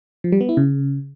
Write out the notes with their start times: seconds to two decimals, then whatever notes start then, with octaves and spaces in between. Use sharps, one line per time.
0.24 F3
0.32 G3
0.41 B3
0.49 E4
0.57 C#3